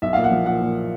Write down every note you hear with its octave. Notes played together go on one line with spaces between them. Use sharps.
B1 E5
A#2 F5
F#5
F3
A#2 F#5
A#2